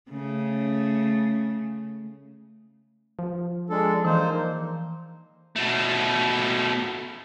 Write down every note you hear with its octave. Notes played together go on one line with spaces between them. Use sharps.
C#3 A3
F3
G#3 D4 A4
E3 A#3 D#4 C5
B2 A3